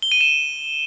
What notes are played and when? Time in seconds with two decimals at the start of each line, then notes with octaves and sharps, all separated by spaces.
0.02 G7
0.12 D#7
0.21 E7